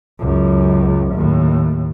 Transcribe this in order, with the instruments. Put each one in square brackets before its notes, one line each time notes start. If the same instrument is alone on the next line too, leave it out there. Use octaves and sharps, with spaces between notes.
[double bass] C#2 F#2
D#2 A2